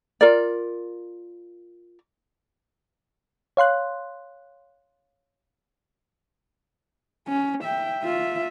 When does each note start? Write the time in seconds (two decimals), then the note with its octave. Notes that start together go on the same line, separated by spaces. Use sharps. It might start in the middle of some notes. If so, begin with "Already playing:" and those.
0.21 F4 A#4 D5
3.57 C#5 F5 C6 F#6
7.28 C#4
7.64 E5 G5
8.04 F4 E5